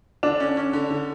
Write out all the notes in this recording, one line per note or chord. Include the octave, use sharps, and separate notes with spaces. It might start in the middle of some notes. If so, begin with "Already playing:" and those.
D3 D4
C#4
C#4
D3
D3